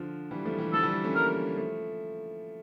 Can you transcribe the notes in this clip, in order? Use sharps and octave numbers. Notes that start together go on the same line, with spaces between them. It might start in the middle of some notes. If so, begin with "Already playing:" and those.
Already playing: D3 F3
E3 G3
F3 A3
E3 G3
D3 F3 A4
E3 G3
A3 C#4
G3 A#3 A#4
F3 A3